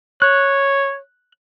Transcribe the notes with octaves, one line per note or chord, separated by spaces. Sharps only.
C#5 F#6